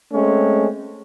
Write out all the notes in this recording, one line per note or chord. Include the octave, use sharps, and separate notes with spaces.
G#3 A3 C4 C#4